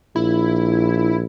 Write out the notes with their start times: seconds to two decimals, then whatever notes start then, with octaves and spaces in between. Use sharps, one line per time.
0.16 A#1 E4